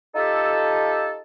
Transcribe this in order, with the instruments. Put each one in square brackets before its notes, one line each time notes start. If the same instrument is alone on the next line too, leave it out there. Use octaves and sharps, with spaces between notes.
[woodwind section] D#4 F4 G4 A4